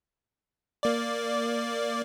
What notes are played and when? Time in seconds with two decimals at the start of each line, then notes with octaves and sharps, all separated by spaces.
0.83 A#3 D5